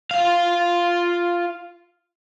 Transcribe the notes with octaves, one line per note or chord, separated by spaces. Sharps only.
F4 F5